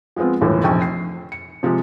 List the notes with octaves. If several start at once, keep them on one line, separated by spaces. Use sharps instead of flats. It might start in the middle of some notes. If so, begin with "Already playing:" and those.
F3 G#3 B3 C4 F4
G1 D#2 A2 E3 F3
F1 A#1 D#4 G5 G#5 C#6
C7
C#7
C3 F3 G#3 G4